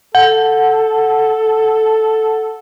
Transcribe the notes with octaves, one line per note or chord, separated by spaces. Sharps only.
A4 F#5